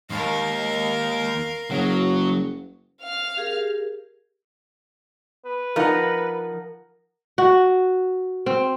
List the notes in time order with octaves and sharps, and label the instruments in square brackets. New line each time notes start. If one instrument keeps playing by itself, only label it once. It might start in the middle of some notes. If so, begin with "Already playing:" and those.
[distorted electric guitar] D#2 [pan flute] G#3 [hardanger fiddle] A#4 F5
[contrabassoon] F#1 [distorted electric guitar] F#3 [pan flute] G#4
[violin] F5 F6
[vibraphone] G4 G#4 A#4
[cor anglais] B4
[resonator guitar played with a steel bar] F3 D#4 [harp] A#4 F#5
[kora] F#4
C4